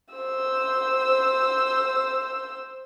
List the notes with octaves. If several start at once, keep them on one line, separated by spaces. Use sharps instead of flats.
C5 E6